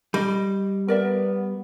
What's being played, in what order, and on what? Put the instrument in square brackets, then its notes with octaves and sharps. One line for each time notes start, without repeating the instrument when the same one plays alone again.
[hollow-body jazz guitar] G3 [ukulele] D#5 B5
[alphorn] B3 [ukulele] A#4 D5 E5